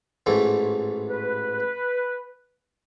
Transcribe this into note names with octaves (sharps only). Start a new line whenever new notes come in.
A1 G#2 E3 A3
B4